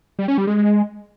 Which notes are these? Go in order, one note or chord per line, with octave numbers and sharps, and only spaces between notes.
G3
C#4
G3
G#3